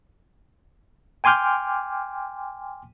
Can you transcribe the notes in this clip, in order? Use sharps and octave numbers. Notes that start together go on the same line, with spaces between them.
G5 G#5 C6 D6 F6 G6